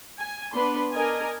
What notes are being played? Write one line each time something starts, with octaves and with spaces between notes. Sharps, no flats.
G#5
B3 D4 B4 C6
D4 A#4 D#5 G#5